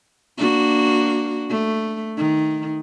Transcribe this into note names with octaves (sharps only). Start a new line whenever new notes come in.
A#3 D4 F#4
A3
D#3